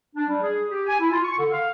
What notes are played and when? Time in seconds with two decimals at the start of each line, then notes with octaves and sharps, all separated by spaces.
0.16 D4
0.28 G3
0.41 G#4
0.70 G4
0.87 G#5
0.99 E4
1.11 F4
1.24 C#6
1.37 D3
1.52 F5